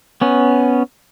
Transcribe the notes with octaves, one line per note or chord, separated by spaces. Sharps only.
B3 C#4